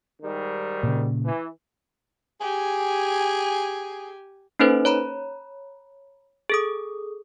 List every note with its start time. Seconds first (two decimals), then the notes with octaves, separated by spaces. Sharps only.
0.22 G#2 D#3 G3
0.83 A#2 C#3
1.25 E3
2.41 G4 G#4 G#5
4.59 A#3 C#4 D#4 A4 B4 C5
4.85 C#5 A#5 B5
6.50 G#4 A4 D#6